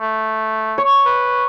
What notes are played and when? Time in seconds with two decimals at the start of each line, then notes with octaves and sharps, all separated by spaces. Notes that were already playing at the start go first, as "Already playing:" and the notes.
0.01 A3
0.78 C#5
1.06 B4